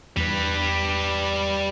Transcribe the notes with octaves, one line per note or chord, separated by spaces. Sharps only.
E2 G3 B4